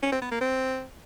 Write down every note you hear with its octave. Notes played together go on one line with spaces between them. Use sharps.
C#4
C4
B3
A#3
C4